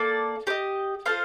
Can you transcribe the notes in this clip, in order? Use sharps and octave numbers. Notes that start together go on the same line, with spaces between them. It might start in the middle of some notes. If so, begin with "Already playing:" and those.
Already playing: A#3 A4 D5
G4 C5 D#5
F4 A4 C5 F5